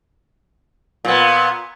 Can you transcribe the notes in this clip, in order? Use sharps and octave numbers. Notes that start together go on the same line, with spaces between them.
A#2 B3